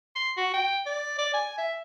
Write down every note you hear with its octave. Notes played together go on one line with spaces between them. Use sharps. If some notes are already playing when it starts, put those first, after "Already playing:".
C6
F#4
G5
D5
D5
G#5
E5